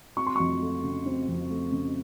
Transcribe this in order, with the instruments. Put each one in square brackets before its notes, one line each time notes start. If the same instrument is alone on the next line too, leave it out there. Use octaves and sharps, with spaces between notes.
[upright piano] C4 C#6
C6
F2 C#6
A3
C#3
C4
F2
A3
C#3